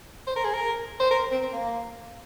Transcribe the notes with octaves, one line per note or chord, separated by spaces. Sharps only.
C5
A#4
G#4
A#4
C5
A#4
C4
A#3